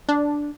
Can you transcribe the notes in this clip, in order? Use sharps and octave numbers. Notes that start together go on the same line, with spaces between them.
D4